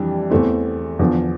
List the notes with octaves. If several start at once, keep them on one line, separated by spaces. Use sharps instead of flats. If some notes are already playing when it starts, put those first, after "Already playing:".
Already playing: F2 E3 G3 D4
E2 E3 A3 C4
E2 D3 F3